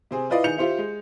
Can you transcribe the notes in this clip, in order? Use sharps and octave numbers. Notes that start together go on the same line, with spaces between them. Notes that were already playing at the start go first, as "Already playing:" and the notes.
C3 C4 G#4
E4 F4 B4 D5 D#5 F5
D#3 G#4 G6 C#7 F7
F4 G4 C5 E5
G#3